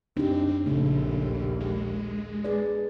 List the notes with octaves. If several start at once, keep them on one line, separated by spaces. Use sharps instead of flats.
F#2 C4 D4 D#4 G4
A#1 D#2 C#3 A3 A4
G#3
G#4 B4 D5